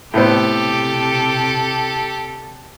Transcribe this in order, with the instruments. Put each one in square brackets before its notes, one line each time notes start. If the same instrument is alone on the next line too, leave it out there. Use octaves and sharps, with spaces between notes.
[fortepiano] A2 B3 C5 [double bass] C3 [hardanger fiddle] G4 [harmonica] A4